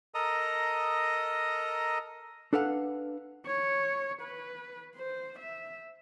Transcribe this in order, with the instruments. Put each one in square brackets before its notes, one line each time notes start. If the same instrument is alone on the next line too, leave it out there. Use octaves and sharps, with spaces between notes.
[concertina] A4 A#4 D#5 A#5 D#6
[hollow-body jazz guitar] D4 A4 B4 F5 F#5
[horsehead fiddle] C#5
B4
C5
E5